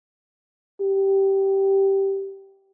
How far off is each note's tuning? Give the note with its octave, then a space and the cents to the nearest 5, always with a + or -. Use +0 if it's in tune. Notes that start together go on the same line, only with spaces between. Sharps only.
G4 -10